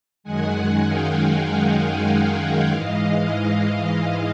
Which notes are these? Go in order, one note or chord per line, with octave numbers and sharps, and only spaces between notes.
F#2 D#3 G#3 F#5 G#5
F5 G5
F5 G5
F#5 G#5
F5 G5
G#2 E3 G#3 D#5 F5
D#5 F5